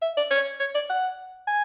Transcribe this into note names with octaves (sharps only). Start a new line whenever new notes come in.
E5
D5
C#5
C#5
D5
F#5
G#5